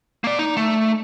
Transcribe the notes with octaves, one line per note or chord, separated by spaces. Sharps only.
A#3 D5
D#4
A3